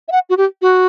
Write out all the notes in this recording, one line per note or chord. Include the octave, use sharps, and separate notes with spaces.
E5
F#5
F#4
G4
F#4